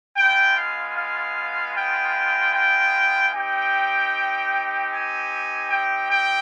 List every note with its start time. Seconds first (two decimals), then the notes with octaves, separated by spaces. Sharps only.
0.17 G#3 B3 F4 G5
0.57 F5
0.97 F5
1.76 G5
2.54 G5
3.34 C4 D#4 G4 G5
4.92 G#5
5.70 G5
6.10 G5